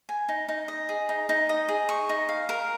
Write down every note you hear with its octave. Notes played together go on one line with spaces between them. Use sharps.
G#5
D#4
D#4
D#5
G#4
D#4
D#4
D#5
G#4
C#6
D#4
F5
A#4